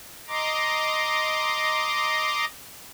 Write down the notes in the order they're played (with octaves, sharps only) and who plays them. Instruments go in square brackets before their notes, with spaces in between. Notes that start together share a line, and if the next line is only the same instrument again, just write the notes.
[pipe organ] D#5 A#5 C6 D6